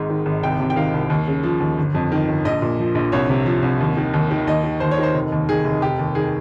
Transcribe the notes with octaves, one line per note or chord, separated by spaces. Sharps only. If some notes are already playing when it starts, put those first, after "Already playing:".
Already playing: G#1 G#2
D#3
G#1
C2 G5
C3
G5
D#3 F5
C2
D#2
C#3
F3
D#2
G1
F2
D#3
G1
A#1 D#5
A#2
F3
A#1
C2 C#5
C3
F3
C2
D#2
D#3
D#2
D#3
D#2 D#5
D#3
D#2 C5
C#5
D#3 C5
F1
D#2
D#3 G#4
F1
F1 G4
D#2
D#3 G#4